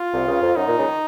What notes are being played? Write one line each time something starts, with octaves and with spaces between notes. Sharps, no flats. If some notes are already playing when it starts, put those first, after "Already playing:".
Already playing: F4
C2 C3
C#2 C#3
F2
F#2 D#4
A#2
C#2 C#3
D#3